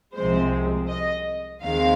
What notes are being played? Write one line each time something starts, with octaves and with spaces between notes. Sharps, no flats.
C2 C3 F3 G#3 C4 C5
D#5
D#2 D#3 G#3 C4 F5